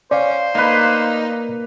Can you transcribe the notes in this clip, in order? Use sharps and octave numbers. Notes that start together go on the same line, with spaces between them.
C#4 C5 D5 F5
A#3 D#4 B4